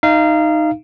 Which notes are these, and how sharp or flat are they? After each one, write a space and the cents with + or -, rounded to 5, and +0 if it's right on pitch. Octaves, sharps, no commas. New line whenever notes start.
D#4 -5 F5 -25